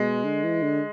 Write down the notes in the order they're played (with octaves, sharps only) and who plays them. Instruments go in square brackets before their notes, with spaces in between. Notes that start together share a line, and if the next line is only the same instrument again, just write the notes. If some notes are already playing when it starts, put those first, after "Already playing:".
Already playing: [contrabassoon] B2 [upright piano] G#3
[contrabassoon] D3
E3
D3